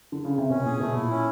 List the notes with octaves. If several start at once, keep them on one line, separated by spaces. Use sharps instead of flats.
D3
C#3
C3
B2 C#4
A#2 G#4
B2 A3
A#2 E4
C#4